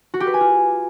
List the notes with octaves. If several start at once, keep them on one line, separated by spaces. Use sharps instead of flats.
F#4
G4
B4
G#5
F4